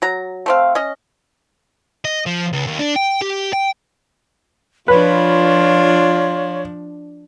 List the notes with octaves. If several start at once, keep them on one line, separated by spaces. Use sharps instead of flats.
F#3 A#5
A3 C4 F5
C#4 D#5
D#5
F3
C#2
D#2
D4
G5
G4
G5
F3 D4 F4 B4 C#5